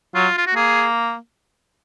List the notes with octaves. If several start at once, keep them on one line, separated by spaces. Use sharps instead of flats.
F#3 F4
F4
F#4
A#3 G#4